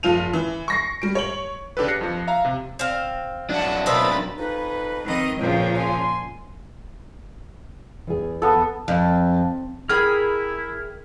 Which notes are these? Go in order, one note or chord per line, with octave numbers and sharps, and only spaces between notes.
F#1 F3 F4 D#7 F7
E3
C#6 A#6 C7
G3 D7
C#5 F#7
C#3 D4 G4 A4 B4
F#6 A#6 C7 C#7
F2 F3
E5 F5 A#5
C3
C4 F5
F#3 D4 D5 E5 F#5 A5
B2 A#4 C5 E5 B5 A6
F2 D#4 B4
D#3 C4 D#5
E2 A#2 C#3 F3 C#5 G5
G#5 C6
E2 G#4
B3 A4
F2
E4 G#4 A#4 G5 B5 F6